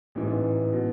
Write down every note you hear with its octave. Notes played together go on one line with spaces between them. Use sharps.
A1 G#2 E3
B2